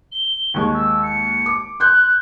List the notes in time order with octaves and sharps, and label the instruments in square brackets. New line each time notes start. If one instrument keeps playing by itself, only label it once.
[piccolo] G7
[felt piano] D#2 G#3 [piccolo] C#6
[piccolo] E6
C#7
[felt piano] D6
[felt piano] C6 G6 [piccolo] F#6